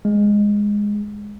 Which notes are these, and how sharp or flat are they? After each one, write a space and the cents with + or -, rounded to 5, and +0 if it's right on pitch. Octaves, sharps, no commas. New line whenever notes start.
G#3 -10